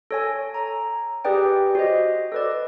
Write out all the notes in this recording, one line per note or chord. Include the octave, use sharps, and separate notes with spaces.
A4 C#5 G#5
A#5
G4 G#4 B4 D5 G5
F#4 C5 D#5
A4 B4 D5